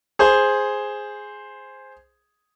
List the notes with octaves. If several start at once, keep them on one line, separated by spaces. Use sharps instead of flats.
G#4 C5